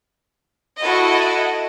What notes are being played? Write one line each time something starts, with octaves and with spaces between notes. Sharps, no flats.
E4 F#4 A4 D#5